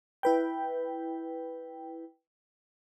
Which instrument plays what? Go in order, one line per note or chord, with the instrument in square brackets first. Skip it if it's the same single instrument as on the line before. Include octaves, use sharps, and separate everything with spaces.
[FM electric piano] E4 B4 G5